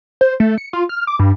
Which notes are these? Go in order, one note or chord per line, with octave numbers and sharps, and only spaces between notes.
C5
A3
C#7
F4
F6
D6
G2